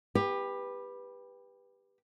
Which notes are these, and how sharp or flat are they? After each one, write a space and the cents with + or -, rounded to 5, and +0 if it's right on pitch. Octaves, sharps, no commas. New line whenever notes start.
G4 +20 B4 -5